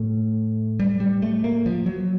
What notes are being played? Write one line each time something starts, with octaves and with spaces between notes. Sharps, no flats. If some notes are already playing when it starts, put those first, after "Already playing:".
Already playing: A2 A3
G3
G3
A3
A#3
F3
F#3